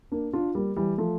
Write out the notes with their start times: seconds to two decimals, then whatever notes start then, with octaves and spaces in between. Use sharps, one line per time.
0.12 A#3 D4
0.33 D4 F4
0.55 G3 A#3
0.76 E3 G3
0.98 F3 A3